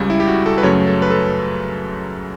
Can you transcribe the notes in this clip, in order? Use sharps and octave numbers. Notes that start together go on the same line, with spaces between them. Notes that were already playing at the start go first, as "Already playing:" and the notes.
Already playing: C#2 C#3 G3
E4
G4
F#4
A4
B4
F#2 C#3 F#3 A3 C#5
A4
B4
A4